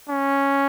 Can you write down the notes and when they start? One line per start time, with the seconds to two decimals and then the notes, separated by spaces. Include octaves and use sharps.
0.09 C#4